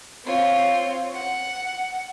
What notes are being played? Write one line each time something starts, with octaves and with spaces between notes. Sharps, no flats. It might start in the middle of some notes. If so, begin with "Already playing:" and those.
C4 F4 C#5
F#5